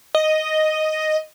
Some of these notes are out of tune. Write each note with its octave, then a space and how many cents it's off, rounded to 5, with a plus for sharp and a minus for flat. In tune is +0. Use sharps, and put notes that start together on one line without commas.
D#5 +0